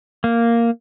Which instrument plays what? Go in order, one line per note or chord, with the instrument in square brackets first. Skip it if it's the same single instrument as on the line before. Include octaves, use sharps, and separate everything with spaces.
[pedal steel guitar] A#3